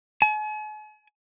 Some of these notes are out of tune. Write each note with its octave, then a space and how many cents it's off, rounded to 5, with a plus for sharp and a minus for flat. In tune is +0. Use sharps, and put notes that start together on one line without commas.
G#5 +45